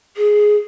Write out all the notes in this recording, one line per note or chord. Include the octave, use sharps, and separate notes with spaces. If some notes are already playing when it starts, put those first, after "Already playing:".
G#4